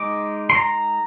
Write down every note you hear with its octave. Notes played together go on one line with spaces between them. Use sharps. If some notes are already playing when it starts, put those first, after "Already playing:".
Already playing: G#3 D#4 D6
C6
A#5